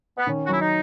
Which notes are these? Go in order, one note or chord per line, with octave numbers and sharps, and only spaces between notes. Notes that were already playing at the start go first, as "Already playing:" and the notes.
B3
D#3 C#4
F#4
F#3 E4
D#4